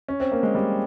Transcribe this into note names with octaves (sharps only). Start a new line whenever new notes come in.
C#4
C4
A#3
G#3
G3